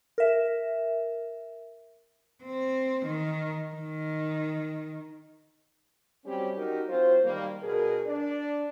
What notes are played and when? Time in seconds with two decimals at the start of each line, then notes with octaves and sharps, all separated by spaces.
0.18 A#4 E5
2.43 C4
3.06 D#3
3.74 D#3
6.26 F#3 G3 C4 C#4 G4
6.56 D#4 F#4 G4 A#4
6.89 F#3 C4 F4 C5
7.24 D#3 G3 A#3
7.63 B2 G#4 A#4
8.06 D4 D5